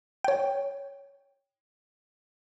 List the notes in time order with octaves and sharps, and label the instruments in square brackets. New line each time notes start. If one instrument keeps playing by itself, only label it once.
[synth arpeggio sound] C#5 G5